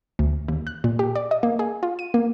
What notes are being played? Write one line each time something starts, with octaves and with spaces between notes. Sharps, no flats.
D2
D#2
F#6
A#2
G4
D5
D#5
A#3
G#4
F4
D#7
A#3